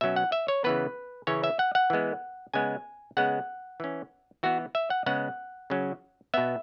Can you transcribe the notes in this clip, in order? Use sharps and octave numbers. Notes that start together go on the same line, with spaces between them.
B2 F#3 C#4 E5
F#5
E5
C#5
C#3 E3 B3 B4
C#3 E3 C#4 C#5
E5
F#5
F#5
E3 G#3 B3
C#3 G#3 B3 G#5
C#3 G#3 B3 F#5
E3 C#4
E3 B3 F#4
E5
F#5
C#3 G#3 B3 F#5
C#3 F#3 C#4
B2 B3 E5